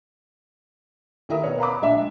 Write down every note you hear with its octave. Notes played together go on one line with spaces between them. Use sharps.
D#2 E4 A#4 E5 D#6
B2 B3 C#5
F5 A#5 B5 D6
A#1 G#3 D4 E5